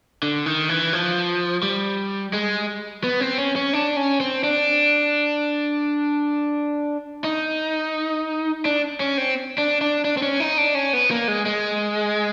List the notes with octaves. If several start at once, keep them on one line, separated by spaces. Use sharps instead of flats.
D3
D#3
E3
F3
G3
G#3
B3
C4
C#4
C#4
D4
C#4
C4
D4
D#4
D4
C#4
C4
D4
D4
D4
C4
C#4
D#4
D4
C#4
B3
A#3
G#3
G#3